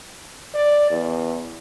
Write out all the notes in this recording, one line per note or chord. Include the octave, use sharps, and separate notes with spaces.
D5
E2